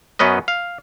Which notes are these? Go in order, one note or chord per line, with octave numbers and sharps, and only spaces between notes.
F#2 B3 C#4 B4 D#5
F5